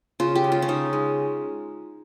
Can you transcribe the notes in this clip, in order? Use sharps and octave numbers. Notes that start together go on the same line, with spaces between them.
C#3 F4
G4
G#3
F4
C#4
C#3 D#4
G#3